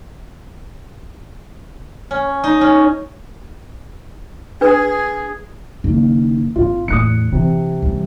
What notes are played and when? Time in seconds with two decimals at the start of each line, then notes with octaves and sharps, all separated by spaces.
2.11 C#4
2.44 D#4
2.61 C#4
4.61 D4 G#4 B4
5.84 F#1 D#3
6.56 G#1 F4
6.88 E2 A2 D#6 F#6 C#7
7.32 C3 E3
7.82 E3 G3